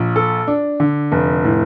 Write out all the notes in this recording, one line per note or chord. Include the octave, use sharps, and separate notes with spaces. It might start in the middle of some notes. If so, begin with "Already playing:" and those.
Already playing: A#1
A4
D4
D3
F1
A2